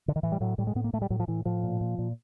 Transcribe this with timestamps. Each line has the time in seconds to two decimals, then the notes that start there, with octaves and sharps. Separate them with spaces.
0.08 D3
0.16 D#3
0.23 A2 E3
0.32 G3
0.40 A2 F#3
0.58 A2 G3
0.67 G#3
0.75 A2 B3
0.84 A#3
0.93 A2 A3
1.02 G3
1.10 A2 F#3
1.20 F3
1.28 A2 E3
1.45 A2 F3
1.63 A#2
1.81 A#2
1.98 A#2